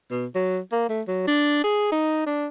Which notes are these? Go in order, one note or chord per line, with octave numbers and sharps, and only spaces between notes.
B2
F#3
A#3
A3
F#3
D4
G#4
D#4
D4